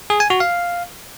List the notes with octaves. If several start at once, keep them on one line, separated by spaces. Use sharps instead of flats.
G#4
G#5
F#4
F5